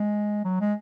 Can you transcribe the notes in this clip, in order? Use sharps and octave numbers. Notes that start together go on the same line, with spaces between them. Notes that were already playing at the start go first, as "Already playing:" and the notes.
Already playing: G#3
F#3
G#3